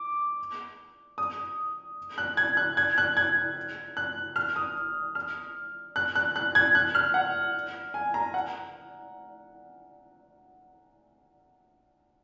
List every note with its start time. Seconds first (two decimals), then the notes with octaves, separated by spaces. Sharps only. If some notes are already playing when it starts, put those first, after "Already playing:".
Already playing: D6
1.18 D#6
2.18 F#6
2.37 G#6
2.57 F#6
2.77 G#6
2.98 F#6
3.17 G#6
3.97 F#6
4.36 F6
4.56 D#6
5.15 F6
5.96 F#6
6.16 F#6
6.36 F#6
6.55 G#6
6.75 F#6
6.95 F6
7.14 F#5
7.94 G#5
8.14 A#5
8.34 F#5